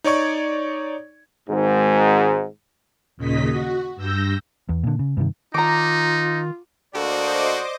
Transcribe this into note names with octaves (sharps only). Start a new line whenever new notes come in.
D#4 C#5 D5 C#6 G#6
G#1 G#2
D#2 A#2 C#3 D#5 B6
F#4
G2 E6 G6 A#6
E2
A#2 D3
C#3
G2 C3 D#3
D#3 D#4 F4 A#5 D6
D2 A#3 F#4 A4 C5 D5 D#5 D6